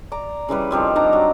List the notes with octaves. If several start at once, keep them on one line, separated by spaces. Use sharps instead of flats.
D5 A#5
C#3 E3 G3 B4
D#3 F3 G3 C4
D4 D#4 A#5
F#3